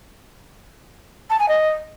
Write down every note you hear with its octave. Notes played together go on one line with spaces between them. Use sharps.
A5
G#5
D#5